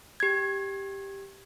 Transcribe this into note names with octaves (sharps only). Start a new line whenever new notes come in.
G4 G#6